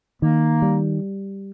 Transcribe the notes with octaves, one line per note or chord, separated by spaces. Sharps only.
D#3 A#3
G3